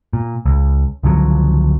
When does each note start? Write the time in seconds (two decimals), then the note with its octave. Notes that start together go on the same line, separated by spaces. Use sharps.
0.13 A#2
0.46 C#2
1.03 C#2 D3 F3 F#3